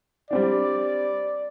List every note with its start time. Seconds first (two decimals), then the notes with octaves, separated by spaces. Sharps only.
0.31 G3 C4 D4 D5